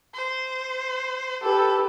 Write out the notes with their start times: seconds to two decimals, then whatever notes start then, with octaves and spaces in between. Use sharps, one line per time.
0.14 C5
1.43 G4 A4 B4